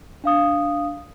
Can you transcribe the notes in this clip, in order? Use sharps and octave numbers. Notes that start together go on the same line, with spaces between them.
D4 F5 D#6